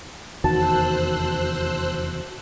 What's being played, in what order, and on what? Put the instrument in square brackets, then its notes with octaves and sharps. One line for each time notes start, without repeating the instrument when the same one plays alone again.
[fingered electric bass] F1 E2 D#3 [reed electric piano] F#4 [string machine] C5 E6 F#6 [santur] A5